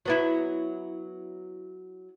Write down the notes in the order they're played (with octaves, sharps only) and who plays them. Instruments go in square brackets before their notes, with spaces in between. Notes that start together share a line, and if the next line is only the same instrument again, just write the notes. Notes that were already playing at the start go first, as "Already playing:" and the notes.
[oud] F#3 B3 E4